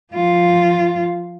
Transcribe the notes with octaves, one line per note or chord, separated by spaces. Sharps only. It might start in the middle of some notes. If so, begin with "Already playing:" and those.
F3 F4